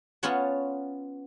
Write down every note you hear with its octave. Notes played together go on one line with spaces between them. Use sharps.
B3 C#4 F4 C#5 F#5 A5